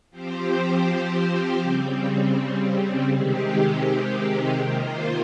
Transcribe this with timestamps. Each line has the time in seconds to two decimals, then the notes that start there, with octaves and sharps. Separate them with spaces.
0.10 F3 C4 G4 C5
1.61 C#3 G3 C4
3.11 C3 D#3 G#3 C4 G4
4.61 C3 D#3 A#3 F4 C5